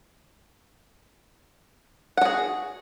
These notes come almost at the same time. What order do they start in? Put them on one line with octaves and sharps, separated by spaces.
F#5 F#4 G#4